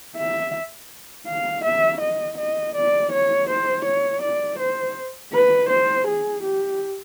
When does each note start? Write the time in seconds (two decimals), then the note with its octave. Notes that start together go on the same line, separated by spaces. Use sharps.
0.17 E5
1.27 F5
1.64 E5
2.01 D#5
2.38 D#5
2.76 D5
3.12 C#5
3.49 C5
3.85 C#5
4.22 D5
4.59 C5
5.33 B4
5.69 C5
6.07 G#4
6.43 G4